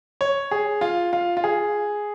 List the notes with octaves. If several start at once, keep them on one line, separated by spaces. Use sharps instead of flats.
C#5
G#4
F4
F4
F4
G#4